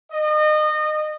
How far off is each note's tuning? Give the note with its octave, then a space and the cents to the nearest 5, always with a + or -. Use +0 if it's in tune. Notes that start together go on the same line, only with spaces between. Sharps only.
D#5 -30